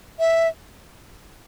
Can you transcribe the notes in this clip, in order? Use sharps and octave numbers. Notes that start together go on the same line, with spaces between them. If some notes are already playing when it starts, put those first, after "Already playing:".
E5